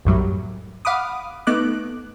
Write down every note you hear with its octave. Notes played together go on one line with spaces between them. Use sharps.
B1 F#2 A2 F#3 G3
F5 F#5 B5 D6 D#6
A3 B3 D#4 D6 F#6